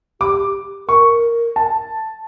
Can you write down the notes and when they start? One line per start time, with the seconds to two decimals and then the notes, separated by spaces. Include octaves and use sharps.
0.21 G4 D6
0.88 A#4 C#6
1.56 A5